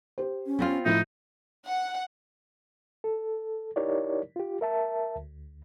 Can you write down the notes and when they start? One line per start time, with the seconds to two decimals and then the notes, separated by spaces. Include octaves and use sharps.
0.18 G4 C5
0.46 C#4
0.59 B3 C4 F4
0.85 A2 F3 D#4 E4 E5
1.67 F#5
3.04 A4
3.76 D#4 E4 G4 A#4 C#5 D5
4.36 F4 G4
4.61 A#4 E5 A5
5.16 D2